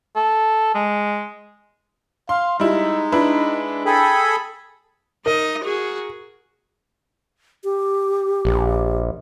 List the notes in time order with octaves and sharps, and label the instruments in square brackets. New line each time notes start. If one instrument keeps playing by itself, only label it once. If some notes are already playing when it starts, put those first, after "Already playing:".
[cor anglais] A4
G#3
[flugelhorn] F5 [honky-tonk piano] C6
[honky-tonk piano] G3 E4 [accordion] G#3 [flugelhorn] D#4
[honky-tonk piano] D4 E4 B4
[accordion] G#4 A4 B5 [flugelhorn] G5
[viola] D#4 D#5 [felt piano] A#4
[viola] F#4 G#4
[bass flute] G4
[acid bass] A#1